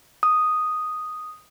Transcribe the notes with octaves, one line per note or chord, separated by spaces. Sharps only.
D#6